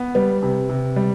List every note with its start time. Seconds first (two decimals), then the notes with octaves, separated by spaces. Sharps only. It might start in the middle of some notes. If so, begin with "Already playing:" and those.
Already playing: B3
0.15 G3 B4
0.42 C3
0.69 C3
0.96 G3